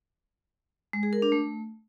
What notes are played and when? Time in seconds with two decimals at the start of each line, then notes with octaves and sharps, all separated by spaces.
0.93 G#3
1.03 G#4
1.13 A#4
1.22 D4
1.32 A3